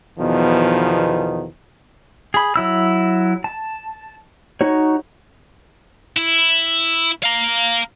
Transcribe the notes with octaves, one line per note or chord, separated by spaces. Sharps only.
E2 B2 D#3 F3
G#4 B5
F#3 E4 E6
A5
D#4 F#4 C#5
E4
F5 A#5